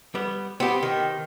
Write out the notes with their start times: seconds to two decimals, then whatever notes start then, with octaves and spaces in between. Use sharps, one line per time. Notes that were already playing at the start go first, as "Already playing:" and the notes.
0.15 G3 B3
0.60 B3 C4 G4
0.83 D#3